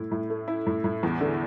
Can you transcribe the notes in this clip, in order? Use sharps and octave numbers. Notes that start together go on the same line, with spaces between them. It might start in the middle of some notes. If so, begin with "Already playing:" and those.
Already playing: A2 A3 E4
A2
A3
E4
A2
A2
E2
D3